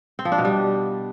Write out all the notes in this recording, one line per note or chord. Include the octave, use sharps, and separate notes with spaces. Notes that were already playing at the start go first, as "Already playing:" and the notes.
C4
F3
D4
B2
G3